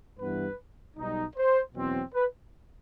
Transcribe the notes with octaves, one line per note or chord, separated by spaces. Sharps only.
G2 E3 B3 B4
B1 B2 G3 D#4
C5
E2 B2 F#3 C4
B4